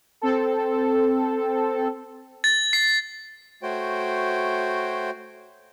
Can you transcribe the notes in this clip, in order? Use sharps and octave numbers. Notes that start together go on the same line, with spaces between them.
C4 A4
A6
C7
A3 F#4 C5 C#5 G5